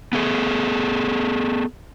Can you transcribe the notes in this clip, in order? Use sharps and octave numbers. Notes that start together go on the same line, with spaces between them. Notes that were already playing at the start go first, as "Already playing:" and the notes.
B3 G#4 A4